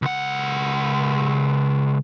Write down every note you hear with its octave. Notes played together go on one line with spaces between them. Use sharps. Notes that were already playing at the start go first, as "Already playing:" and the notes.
C#2 F#5